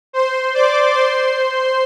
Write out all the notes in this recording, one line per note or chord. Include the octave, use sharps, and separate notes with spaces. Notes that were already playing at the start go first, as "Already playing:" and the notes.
C5 C6
D5 D6
C5 C6